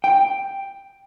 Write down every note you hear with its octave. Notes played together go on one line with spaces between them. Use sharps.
G5